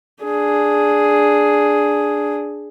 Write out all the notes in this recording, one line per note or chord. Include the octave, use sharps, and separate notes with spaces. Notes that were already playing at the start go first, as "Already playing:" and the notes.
D4 G#4